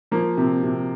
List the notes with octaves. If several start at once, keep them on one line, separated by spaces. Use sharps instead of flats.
F3 A#3
C3
C3